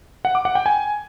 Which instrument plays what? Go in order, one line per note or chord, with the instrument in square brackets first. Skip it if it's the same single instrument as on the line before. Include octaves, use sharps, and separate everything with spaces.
[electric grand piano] F#5
D6
F#5
G5
G#5